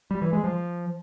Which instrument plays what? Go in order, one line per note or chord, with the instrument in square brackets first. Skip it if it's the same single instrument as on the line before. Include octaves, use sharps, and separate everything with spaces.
[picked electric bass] G3
E3
G#3
F3